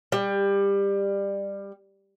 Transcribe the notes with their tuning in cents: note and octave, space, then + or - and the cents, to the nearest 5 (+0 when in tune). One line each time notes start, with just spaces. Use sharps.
G3 +20